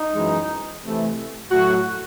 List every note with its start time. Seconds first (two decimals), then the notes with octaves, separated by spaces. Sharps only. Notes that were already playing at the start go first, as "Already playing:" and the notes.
Already playing: D#4
0.13 F#2 E3 G#3
0.83 C3 E3 A3
1.50 A2 F#3 A3 F#4